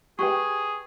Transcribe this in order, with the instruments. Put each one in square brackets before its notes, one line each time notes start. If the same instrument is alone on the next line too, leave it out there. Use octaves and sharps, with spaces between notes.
[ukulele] G4 B4 G5 [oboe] G#4 [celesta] C#6